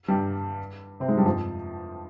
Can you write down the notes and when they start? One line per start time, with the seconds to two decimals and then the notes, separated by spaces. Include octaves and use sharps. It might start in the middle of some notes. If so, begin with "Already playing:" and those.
0.08 G2 G3
1.00 C3 C4
1.08 G#2 G#3
1.17 G2 G3
1.25 F2 F3